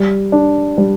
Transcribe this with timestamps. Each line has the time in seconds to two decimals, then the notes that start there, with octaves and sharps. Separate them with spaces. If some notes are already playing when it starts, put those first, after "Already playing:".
Already playing: G3
0.32 D4
0.78 G3